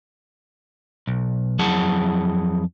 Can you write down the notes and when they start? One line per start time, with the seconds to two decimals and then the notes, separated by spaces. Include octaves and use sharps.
1.07 B1
1.59 F2 F#3 E4 G#4 F#5 A5